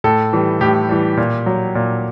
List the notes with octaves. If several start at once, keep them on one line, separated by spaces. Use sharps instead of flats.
A2 A4
E3 G3
A2 G4
E3 G3
A#2
F#3
A#2